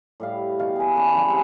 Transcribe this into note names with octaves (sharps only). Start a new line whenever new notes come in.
A2 G3 F5
B2 F5 G5 C#6
G#4 B4
C#4 B4 D5 A5
C#3 E3 F#3 G3
C4 G#4 F#5